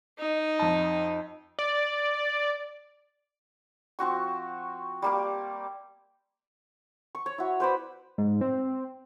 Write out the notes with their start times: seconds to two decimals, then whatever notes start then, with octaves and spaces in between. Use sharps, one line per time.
0.19 D#4
0.59 F2 A5
1.59 D5
3.99 F3 C4 F#4 C#6
5.02 G3 A#3 G4
7.15 C#6
7.26 C#5
7.38 E4 F#4
7.60 B4 C5 D5 B5
8.18 G#2
8.41 C4